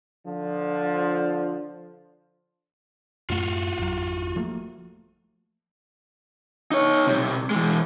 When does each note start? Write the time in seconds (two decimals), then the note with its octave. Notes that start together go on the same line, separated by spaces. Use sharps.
0.25 D3 F3
3.30 F#2 A2 A3 F4 F#4
3.78 G#1 F2 F#3
4.36 F3 A3 A#3
6.72 D#4 C#5
7.07 B1 C3
7.51 E3 G#3